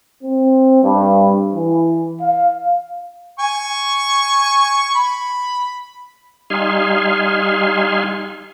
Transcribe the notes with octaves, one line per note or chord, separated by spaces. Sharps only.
C4
G2
E3
F5
G#5 C#6
B5
G3 D#4 F5 G#5 C6